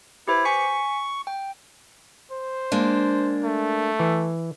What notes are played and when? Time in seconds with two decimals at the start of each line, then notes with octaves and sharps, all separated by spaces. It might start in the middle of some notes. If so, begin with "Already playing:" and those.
0.28 E4 G4 B4 C5
0.45 G#5 C#6 B6 C#7
1.27 G5
2.32 C5
2.72 G#3 A#3 D4
3.43 A3
3.99 E3